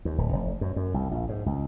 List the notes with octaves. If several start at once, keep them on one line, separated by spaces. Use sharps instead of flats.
D#2
D1
F1
F#2
F#2
C2
A#1
G#2
C#2